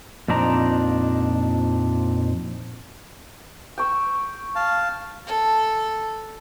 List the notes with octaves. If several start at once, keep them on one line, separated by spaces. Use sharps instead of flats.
F2 A#2 C4 D4 D#4 A#5
G5 C#6 E6
F5 A5
A4